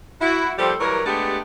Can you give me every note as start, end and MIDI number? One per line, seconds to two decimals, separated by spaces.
0.21 0.53 64
0.21 0.53 66
0.59 0.74 53
0.59 0.74 55
0.59 0.74 58
0.59 0.74 67
0.59 0.74 69
0.59 0.74 72
0.80 1.01 52
0.80 1.01 54
0.80 1.01 55
0.80 1.01 70
1.06 1.39 56
1.06 1.39 57
1.06 1.39 59
1.06 1.39 62
1.06 1.39 67